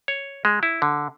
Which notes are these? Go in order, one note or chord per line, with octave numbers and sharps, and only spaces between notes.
C#5
G#3
E4
D3